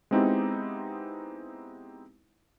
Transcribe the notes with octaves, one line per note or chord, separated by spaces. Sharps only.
G#3 B3 C4 D#4 E4 G4